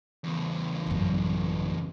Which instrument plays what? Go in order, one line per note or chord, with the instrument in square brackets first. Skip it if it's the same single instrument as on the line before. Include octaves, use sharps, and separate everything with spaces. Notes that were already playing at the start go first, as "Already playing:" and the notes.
[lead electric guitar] E2 C#3
[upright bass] A1 F#2